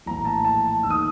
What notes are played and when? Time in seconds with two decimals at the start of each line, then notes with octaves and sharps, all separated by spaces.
0.06 A#1 A2 E3 A#5
0.25 A5
0.45 A5
0.83 D#2 D#3 E6
0.90 D#6